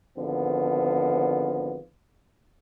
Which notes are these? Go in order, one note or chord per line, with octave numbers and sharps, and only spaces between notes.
G#1 D3 F3 B3